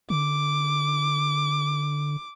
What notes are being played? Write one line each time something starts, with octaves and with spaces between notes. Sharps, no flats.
D3 D6